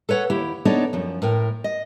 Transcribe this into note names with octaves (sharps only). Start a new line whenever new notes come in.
A4 B4 C#5 F#5
D#2 E4 G4
B3 D4 D#4 A4 C#5 D5
F#2 F3
A2 A#4 G5
D#5